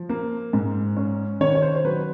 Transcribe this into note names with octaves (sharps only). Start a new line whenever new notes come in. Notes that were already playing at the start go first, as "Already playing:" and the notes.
Already playing: F3
A#3
G#2
C#4
D#3 C#5
C#5
C5
C5
F#3 B4